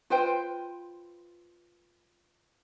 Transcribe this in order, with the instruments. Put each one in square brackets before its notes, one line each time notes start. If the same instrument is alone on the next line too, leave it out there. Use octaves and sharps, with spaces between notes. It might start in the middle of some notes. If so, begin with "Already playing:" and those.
[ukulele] F4 B4 C5 G5